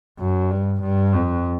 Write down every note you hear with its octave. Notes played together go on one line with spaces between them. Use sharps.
F#2
G2
G2
F2